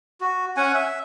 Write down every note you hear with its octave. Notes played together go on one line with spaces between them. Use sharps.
F#4
C#4 F#5 G#5
E5